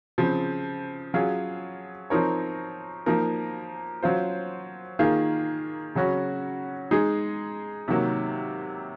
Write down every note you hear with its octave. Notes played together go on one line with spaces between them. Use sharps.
C#3 F3 C4
F#3 C#4 F4 G#4
F3 C4 D#4 A#4 C#5
F3 A#3 D#4 A#4
F#3 C#4 F4 C5
D#3 A#3 F4 G#4
C#3 F#3 C#4 F#4
G#3 D#4 G#4
C3 D#3 F#3 A#3